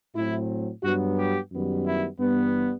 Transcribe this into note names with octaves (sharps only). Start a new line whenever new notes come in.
A2 F#3 C4 E4
G2 F#3 B3 F#4
G4
F#2 D#3 G3 B3
E4
G2 E3 G3 B3